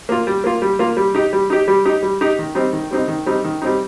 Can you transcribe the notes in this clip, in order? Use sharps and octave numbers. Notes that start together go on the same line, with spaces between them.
A#3 F4
G3
A#3 F4
G3
A#3 F4
G3
D#4 G4
G3
D#4 G4
G3
D#4 G4
G3
D#4 G4
D#3
G3 C4 D#4
D#3
G3 C4 D#4
D#3
G3 C4 D#4
D#3
G3 C4 D#4